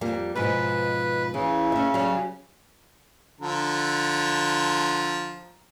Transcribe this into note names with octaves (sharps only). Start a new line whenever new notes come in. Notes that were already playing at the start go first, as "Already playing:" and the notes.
F2 G3 A#3
G#2 B2 F3 B4
C#3 E3
C#4 E5
F#3 G3 C#4
D3 F3 A#5